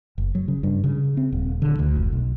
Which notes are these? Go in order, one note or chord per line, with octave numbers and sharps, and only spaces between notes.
F#1
F#3
C#3
G2
C#3
C4
D#1
D3
D2
F1
B1